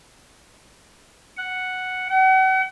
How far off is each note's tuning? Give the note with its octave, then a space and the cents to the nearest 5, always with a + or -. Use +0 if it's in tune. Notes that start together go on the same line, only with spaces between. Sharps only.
F#5 +0
F#5 +40